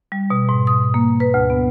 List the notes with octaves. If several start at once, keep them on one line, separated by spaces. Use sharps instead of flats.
G3
B2
G#2
D#6
A#3
B4
D2
B3